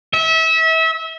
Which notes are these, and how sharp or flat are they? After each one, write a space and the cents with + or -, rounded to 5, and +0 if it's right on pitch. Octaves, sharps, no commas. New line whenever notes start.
E5 -30